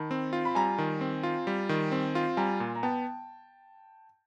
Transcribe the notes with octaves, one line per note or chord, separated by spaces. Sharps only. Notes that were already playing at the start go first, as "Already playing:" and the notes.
Already playing: D#3 A5 B5
C4
F4
B5
G3 G#5 A#5
D#3
C4
F4
G3
D#3
C4
F4
G3 G#5 A#5
A#2
A#5
B3 G5 A5